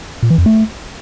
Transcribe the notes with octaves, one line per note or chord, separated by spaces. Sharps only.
A#2
E3
F2
A3